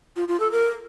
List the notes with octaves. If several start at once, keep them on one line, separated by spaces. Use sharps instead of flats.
F4
F4
A4
A#4